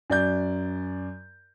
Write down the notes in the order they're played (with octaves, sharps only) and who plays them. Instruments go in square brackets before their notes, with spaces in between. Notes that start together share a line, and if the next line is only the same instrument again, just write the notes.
[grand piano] F#2 D5 G6